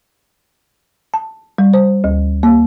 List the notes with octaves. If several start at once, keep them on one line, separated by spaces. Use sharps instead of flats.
A5
G3
C5
D2
A#3